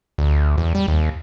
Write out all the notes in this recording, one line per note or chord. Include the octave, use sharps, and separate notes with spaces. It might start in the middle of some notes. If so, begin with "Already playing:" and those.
D2
E2
G3
D#2